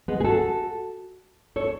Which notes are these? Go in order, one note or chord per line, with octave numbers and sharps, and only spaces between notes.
G#3 B3
G#4
F#4 A4
A4 C#5